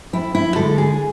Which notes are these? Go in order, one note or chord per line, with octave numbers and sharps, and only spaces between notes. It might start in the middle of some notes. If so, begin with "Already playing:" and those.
F2 E4
E4
D3 G#3 A4
G#4